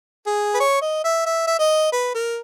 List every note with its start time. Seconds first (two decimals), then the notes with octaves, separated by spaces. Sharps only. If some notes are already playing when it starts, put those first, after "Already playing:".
0.26 G#4
0.54 B4
0.60 C#5
0.82 D#5
1.04 E5
1.26 E5
1.47 E5
1.59 D#5
1.92 B4
2.15 A#4